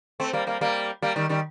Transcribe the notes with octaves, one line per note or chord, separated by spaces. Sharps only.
A3 C4
G3 A#3
G3 A#3
G3 A#3
G3 A#3
D#3 G3
D#3 G3